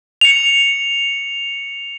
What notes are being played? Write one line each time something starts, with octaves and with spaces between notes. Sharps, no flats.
C#7 F7